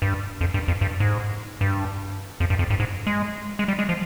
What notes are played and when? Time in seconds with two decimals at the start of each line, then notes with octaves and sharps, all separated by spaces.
0.02 G2
0.41 F2
0.54 G2
0.68 F2
0.81 G2
1.00 G#2
1.61 G2
2.40 F2
2.50 G2
2.59 F2
2.70 G2
2.80 G#2
3.07 G#3
3.59 G#3
3.68 G3
3.79 G#3
3.89 F3